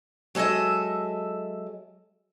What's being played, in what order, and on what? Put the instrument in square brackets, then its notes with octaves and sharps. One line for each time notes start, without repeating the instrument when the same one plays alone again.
[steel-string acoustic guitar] F#3 G#3 A4 D#5 E5